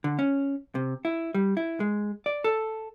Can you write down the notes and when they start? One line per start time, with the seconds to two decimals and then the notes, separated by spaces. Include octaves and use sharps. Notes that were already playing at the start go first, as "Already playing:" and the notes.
0.04 D3
0.19 C#4
0.75 C3
1.05 E4
1.34 G3
1.57 E4
1.80 G#3
2.26 D5
2.44 A4